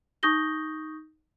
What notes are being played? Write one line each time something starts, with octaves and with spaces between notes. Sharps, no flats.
D#4 C#6 D#6 G6 A#6 G7